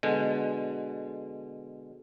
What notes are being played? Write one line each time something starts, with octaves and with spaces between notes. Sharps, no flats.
B2 D3 G#3